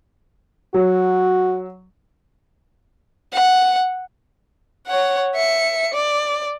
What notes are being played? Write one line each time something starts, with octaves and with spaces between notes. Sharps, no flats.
F#3 F#4
F#5
C#5 F#5
E5 C#7
D5